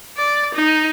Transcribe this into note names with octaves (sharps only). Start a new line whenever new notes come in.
D5
D#4